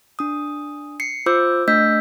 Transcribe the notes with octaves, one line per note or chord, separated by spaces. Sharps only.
D4 D#6
C7 C#7
F4 C5 D6 E6 G6
A3 D4 D#5 E6 G6 B6